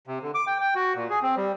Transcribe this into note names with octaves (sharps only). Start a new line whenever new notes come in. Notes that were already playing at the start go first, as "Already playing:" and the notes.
C3
D3
D6
G5
G5
F#4
A#2
G#4
C4
G3